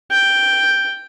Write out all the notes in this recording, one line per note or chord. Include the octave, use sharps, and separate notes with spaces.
G5